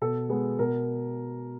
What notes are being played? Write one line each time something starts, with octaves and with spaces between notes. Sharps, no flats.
B2 A4
G#3 B3
B2 A#4